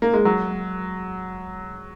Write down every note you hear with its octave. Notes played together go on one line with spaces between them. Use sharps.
A#3
G#3
F#3